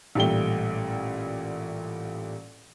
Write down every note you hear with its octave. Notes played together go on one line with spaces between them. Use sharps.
A1 A#2 G3 A3 G5 G7